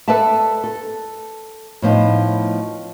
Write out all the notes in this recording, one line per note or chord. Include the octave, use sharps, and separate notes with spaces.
A4 B4 D5 E5 A5
A4
A2 F3 B3 D#4